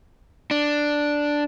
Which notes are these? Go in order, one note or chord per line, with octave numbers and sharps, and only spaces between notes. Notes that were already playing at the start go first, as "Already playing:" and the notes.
D4